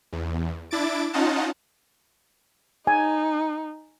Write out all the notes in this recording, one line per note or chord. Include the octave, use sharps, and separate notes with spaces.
E2
D4 E4 D6 A6 D7
C#4 D#4 F4 D#5 F#5 A5
D#4 G#5